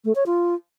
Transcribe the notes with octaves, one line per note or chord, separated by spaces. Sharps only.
A3
C#5
F4